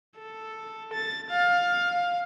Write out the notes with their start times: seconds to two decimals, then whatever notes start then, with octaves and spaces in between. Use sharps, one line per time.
0.19 A4
0.93 A6
1.31 F5